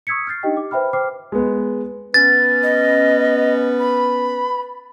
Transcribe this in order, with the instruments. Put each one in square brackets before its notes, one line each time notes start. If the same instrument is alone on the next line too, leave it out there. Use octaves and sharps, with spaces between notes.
[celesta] C#6 D#6 E6 G#6 B6 C#7
F6 G6 A6 C7
D4 D#4 G4 D#5 G5
D6
B4 C5 E5 G5 B5 F6
C5 G5 D6 F6 C7
[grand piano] G#3 B3
[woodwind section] B3 C#4 [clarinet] B4 [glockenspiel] A6
[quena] D#5
B5